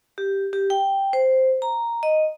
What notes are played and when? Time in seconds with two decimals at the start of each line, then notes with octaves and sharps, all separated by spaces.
0.18 G4
0.53 G4
0.70 G5
1.13 C5
1.62 A#5
2.03 D#5